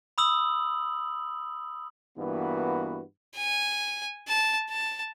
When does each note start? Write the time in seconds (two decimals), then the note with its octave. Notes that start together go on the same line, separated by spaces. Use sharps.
0.18 B5 D#6 E6 F#7
2.17 G2 E3 A#3 B3 F#4 B4
3.35 G#5
4.29 A5
4.70 A5